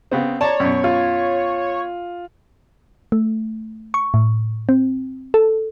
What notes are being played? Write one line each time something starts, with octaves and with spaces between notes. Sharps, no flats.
C#3 B3 C4
C#5 D5 A5 A#5
F#2 B2
F4
A3
C#6
A2
C4
A4